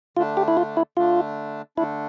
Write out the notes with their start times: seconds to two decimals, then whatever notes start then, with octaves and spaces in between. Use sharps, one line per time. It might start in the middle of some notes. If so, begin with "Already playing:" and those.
0.17 D3 A3 D4 F4
0.37 G4
0.48 E4
0.57 F4
0.77 E4
0.97 D3 A3 D4 F4
1.77 D3 A3 D4 E4